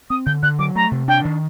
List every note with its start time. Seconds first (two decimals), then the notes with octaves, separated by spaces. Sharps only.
0.10 C4 D#6
0.26 D3 G6
0.42 D3 F#6
0.59 F#3 D6
0.75 A3 A#5
0.91 C3
1.08 D4 G5
1.25 D#3